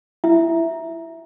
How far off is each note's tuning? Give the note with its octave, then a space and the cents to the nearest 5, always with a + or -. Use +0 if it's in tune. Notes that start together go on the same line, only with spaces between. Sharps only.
E4 +15 E5 +0